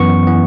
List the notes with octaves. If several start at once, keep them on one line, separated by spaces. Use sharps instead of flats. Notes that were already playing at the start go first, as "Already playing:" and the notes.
Already playing: F#2 E3 B3 C#6
E3 B3